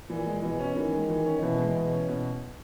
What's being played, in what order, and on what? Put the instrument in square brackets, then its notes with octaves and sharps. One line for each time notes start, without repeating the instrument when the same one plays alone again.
[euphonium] A#2 [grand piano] E3
[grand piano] G#3
[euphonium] B2 [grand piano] E3
[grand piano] C#4
[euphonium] D#3 [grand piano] E3
[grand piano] G#3
E3
C#4
[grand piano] B2 [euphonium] E3
[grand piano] G#3
B2
C#4
B2